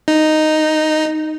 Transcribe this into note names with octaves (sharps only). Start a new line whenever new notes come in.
D#4